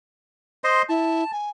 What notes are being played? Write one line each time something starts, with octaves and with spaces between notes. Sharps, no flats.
C5 D#5 C6
E4 A5
G#5